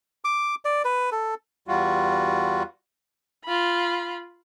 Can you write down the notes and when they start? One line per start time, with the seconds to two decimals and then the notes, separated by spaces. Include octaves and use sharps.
0.25 D6
0.65 D5
0.85 B4
1.12 A4
1.68 E2 G3 F4 F#4
3.45 F4 B5